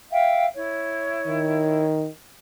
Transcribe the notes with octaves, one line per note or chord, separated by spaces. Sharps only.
E5 F5 G5
E4 C#5
D#3